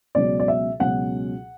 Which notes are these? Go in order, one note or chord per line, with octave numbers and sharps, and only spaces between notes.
C#2 B2 F#3 C#4 D5
D5
E5
C#2 B2 F#3 C#4 F#5